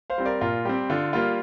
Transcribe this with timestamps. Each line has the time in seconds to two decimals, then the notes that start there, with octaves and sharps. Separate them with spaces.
0.10 C5 F5
0.18 G3 C4
0.25 A#4 D5
0.41 A#2 F4 A#4
0.65 G3 C4 G4
0.90 D3 F4
1.13 G3 A#3 F4